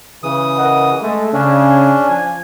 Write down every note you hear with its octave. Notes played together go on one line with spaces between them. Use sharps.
C#3 E3 D#6
A#4 D#5 F#5
G#3 A3
C#3 C#4 D4
F3 G#5